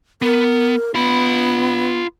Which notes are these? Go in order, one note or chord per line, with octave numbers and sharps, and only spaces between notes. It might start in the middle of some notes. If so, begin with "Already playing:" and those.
B3 A#4
B3 F4 B5